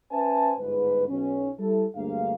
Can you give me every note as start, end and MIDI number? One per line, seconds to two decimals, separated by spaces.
0.11 0.53 61
0.11 0.53 71
0.11 0.53 72
0.11 0.53 76
0.11 0.53 80
0.11 0.53 81
0.58 1.05 31
0.58 1.05 44
0.58 1.05 71
1.08 1.50 35
1.08 1.50 61
1.58 1.85 55
1.58 1.85 64
1.58 1.85 69
1.96 2.32 38
1.96 2.32 43
1.96 2.32 56
1.96 2.32 58
1.96 2.32 77